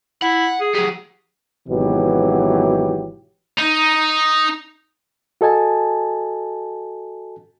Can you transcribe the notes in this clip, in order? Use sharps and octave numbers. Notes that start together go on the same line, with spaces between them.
E4 F#5
G#4
F#3 G3 G#4
G#1 B2 E3 F#3 G4
D#4
F#4 A4 D#5 G#5 A5